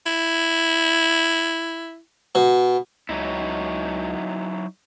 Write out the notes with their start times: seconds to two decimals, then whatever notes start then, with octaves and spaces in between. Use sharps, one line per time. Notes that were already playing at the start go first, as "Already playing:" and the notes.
0.06 E4
2.35 B2
3.09 C#2 F#3 D#4 E4